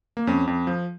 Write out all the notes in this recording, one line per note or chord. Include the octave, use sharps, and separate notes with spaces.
A#3
F2 C#4
F2
F3